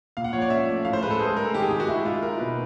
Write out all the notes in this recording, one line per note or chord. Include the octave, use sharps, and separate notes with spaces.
A#2 F5
F#5
F3 C#5
D5
C#4 E5
A3
A2 F5
C5
G#3 B4
A4
G#3 G#4
G#3 A#4
A4
D#3 G4
G#4
D#3 G4
F#4
G#3 E4
G#3 F4
D#4 A#4
B2 B4